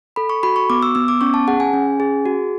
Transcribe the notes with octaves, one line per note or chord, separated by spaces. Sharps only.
A4 B5
C#6
F#4 B5
C#6
B3 D6
E6
B3 E6
D6
C#4 C#6
A5
G#4 F#5
G#5
C#4
G#4
F#4